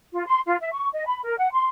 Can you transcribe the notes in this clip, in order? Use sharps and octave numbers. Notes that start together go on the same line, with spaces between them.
F4
C6
F4
E5
C#6
D#5
B5
A#4
F#5
C6